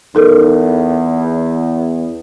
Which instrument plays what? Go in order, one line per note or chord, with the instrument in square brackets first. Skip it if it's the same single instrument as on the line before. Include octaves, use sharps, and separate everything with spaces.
[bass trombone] E2 [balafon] D#4 A4 A#4